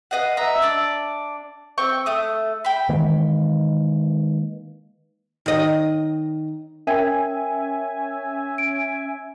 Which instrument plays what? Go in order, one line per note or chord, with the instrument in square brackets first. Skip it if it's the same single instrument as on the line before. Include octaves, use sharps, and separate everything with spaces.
[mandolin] B4 D#5 F5 F#5
D#5 E5 A#5
D4 D5
C4 G5 C#6
A3 D#6
G5 B5
[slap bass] D#3 E3 G#3 A#3
[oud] D#3 D#5
[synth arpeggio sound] C#4 E5 G#5 [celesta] A#4 G5 G#6
[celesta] D7